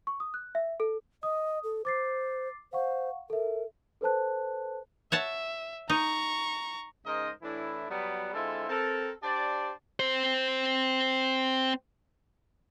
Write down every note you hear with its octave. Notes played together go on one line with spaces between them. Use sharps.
C#6
D#6
F#6
E5
A4
D#5 D#6
A4
C5 D6 A6 C7
C5 F5 F#5 C#6
A4 A#4 E5
A4 B4 C5 A5 F#6
C#5 E5 F#5 A5
D#4 A#5 C#6
G#2 C#3 D#4 A#4 C5 D#5
A2 E3 D4 E4
F#3 G3 B3
D3 G#3 C4 E4 F4 A4
C4 A4 A#4
D4 G4 C5 D5
C4 C5